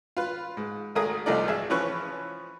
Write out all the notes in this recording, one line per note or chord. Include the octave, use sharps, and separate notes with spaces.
F4 B4
G#2
G#1 A3 G#4 A#4 D#6
C2 F3 A3 D#4 A#4 D5
G#1 G#4 E5
E3 F3 C#4 B4 C#6